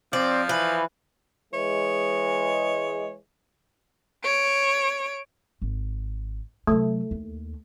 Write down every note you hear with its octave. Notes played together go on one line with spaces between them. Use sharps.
F3 C4 D5
E3 B4
E3 G#3 C#5
C#5 D7
G#1
C3 F#3 A3
D#2